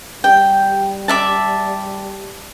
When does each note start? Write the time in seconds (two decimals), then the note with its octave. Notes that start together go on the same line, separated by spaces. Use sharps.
0.24 G3 G5
1.08 D5 E5 A5